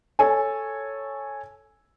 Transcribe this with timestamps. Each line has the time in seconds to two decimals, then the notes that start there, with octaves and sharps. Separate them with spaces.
0.19 A4 C#5 G#5